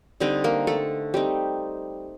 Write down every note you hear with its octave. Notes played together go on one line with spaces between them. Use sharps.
D3 G3 C4 D#4 D#5
A#3 A#4
A3 A4
G3 C4 D#4 G4